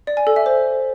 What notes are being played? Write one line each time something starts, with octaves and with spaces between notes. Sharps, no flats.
D5
G#5
A4
E5
C5